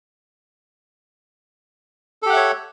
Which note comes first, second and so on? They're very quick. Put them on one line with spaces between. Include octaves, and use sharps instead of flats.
A4 G4 F#5 E5 C#5